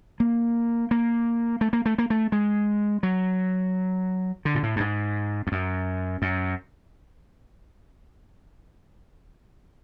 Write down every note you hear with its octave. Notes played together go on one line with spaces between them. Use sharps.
A#3
A#3
A3
A#3
A3
A#3
A3
G#3
F#3
D3
A#2
A2
G2
G#2
F2
F#2
F#2